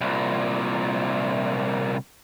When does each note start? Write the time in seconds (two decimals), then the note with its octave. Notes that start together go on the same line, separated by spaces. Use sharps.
0.01 C2 A#2